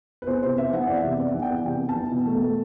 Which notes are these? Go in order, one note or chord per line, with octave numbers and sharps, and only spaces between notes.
B4
E2 C5
C3 C5
B3 E5
E3 F#5
E2 D5
E5
C3
B3 D5
E3 F#5
G5
E2
C3 G5
B3
A5
E3
B2
A3
A3